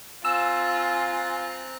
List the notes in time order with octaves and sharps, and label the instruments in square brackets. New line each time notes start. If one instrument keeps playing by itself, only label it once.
[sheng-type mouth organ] C4 A#5 F#6 [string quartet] F4 [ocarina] G#5 [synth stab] E6